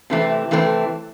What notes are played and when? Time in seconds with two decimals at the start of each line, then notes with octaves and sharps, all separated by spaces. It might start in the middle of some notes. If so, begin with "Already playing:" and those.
0.10 C3 E3 A3 C4
0.51 C3 E3 A3 C4